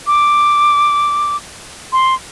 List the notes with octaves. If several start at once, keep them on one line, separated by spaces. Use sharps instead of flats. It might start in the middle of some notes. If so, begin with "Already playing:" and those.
D6
C6